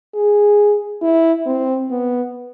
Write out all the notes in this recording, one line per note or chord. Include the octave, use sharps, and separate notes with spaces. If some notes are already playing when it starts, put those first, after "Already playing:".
G#4
E4
C4
B3